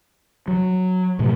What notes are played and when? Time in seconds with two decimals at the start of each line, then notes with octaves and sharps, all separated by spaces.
0.48 F#3
1.19 G#2 B2 F3 A3